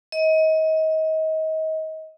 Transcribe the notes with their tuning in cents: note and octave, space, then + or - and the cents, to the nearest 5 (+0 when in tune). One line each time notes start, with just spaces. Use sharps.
D#5 +30